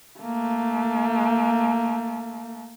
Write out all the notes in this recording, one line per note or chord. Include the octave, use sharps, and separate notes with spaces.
A3 A#3